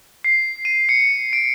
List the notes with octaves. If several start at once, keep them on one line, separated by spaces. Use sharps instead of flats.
C7
D#7
C#7
D7